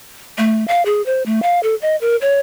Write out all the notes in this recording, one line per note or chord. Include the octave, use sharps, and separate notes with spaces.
A3
F5
G#4
C5
A3
F5
A4
D#5
A#4
C#5